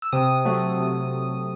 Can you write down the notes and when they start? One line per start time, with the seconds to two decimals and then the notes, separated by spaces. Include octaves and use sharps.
0.02 E6
0.12 C3 D#6
0.45 F#3 A3
0.78 C3